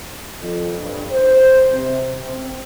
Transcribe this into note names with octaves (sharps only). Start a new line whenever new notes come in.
F2
G2
C5
C3
C4